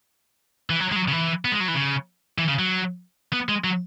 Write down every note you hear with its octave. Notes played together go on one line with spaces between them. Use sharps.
E3
F#3
G#3
F#3
C#3
E3
B3
G#3
F#3
E3
C#3
E3
C#3
F#3
B3
G#3
F#3